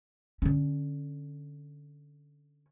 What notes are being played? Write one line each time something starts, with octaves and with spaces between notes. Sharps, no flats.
D3 C#4